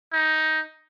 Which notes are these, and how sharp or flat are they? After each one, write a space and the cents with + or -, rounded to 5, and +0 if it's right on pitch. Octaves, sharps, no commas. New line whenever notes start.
D#4 +10